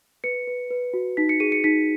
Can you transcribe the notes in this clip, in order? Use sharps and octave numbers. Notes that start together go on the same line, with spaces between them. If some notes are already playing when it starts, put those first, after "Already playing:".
B4 C#7
B4
B4
F#4
D#4 B6
C#7
G#4 D#7
C#7
D#4 B6